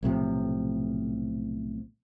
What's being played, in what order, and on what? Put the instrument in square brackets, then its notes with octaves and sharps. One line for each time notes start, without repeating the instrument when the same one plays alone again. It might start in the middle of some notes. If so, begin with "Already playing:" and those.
[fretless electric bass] B1 A2 C3 F3